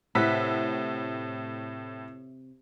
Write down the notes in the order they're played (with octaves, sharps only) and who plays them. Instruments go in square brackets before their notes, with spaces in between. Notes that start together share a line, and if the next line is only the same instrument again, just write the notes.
[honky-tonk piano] A2 E6 B6 [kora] C3 B4 F#5